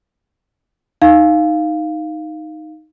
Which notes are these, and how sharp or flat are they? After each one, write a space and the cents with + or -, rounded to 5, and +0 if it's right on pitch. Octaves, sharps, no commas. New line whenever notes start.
D#4 +0 F5 +0